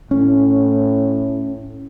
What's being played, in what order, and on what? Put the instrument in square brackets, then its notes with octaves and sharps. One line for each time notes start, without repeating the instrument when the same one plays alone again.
[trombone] A2 [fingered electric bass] C#4